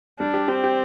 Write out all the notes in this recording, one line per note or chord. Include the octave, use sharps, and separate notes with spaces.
G3 D4
G4
C4 G4
G4